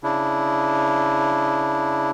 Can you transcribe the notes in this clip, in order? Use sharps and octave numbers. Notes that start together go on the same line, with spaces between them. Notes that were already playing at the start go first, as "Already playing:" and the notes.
C#3 D4 E4